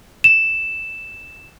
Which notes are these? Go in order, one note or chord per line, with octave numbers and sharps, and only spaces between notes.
E7